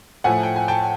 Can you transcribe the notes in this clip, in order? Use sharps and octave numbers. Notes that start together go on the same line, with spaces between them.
A2 F3 A3 F#5 G#5
G5
G#5
G5 A5